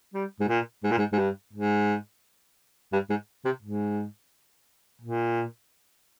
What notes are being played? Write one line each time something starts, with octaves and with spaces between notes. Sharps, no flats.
G3
G#2
A#2
G#2
A#2
G#2
G#2
G2
G#2
G2
G#2
C3
G#2
A#2